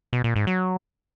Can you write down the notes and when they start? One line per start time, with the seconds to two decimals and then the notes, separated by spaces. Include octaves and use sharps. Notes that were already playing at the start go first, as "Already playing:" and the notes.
0.13 B2
0.24 A#2
0.36 G#2
0.47 F#3